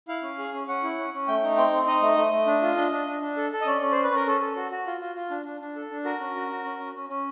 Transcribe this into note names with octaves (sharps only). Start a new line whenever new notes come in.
E4 F5
C#4
G#4
C#4
C#4 F#5
E4
C#4
C#4
A3 G5
D#4
C4 G5
C4
D#4 D#5
A3
A3
A3
D4
F4
D4
D4
D4
D4
A4
A4
D#5
C#4 D5
C#4
C#4 C5
B4
C#4 A#4
C#4 A4
A4
F#4
F#4
F4
F4
F4
D4
D4
D4
A4
D4
F#4 A#4
C#4
F#4
F#4
C#4
C#4
C#4
C#4